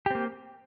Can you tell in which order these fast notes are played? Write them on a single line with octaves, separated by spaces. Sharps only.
G4 C4 A#3